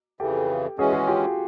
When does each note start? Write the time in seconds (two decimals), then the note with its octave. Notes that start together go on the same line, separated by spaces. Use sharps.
0.20 F2 C#3 E3 G4 A4
0.78 E3 G#3 C#4 F#4 G#4
0.93 F#4 G#4
1.08 F4 G4